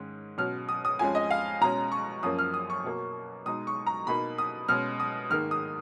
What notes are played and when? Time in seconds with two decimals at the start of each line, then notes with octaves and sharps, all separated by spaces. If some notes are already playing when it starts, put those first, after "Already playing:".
Already playing: G#2 D#3 G#3 C#4
0.38 B2 F#3 C#4 F6
0.69 D#6
0.85 D#6
0.99 F2 F3 G#3 C#4 G#5
1.15 D#5
1.31 F5
1.61 B2 G#3 C#4 A#5
1.92 C#6
2.23 F#2 F3 A#3 C#4 D#6
2.39 F6
2.54 D#6
2.70 C#6
2.84 B2 F#3 A#3
3.46 B2 G#3 D#4 D#6
3.67 C#6
3.87 A#5
4.07 B2 A#3 D#4 B5
4.38 D#6
4.68 B2 G#3 C#4 F6
5.00 D#6
5.30 G#2 D#3 A#3 F6
5.51 D#6